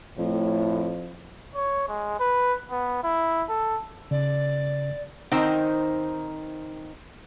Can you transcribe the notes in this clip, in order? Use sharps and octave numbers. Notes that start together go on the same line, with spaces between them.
F2 A2
C#5
G#3
B4
B3
E4
A4
C#3 D5
D#3 C4 D#4 C5 G5